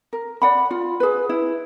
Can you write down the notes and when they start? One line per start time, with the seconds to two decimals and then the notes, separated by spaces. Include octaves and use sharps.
0.13 A#4
0.42 D5 F#5 B5
0.71 F4
1.00 G#4 B4
1.29 E4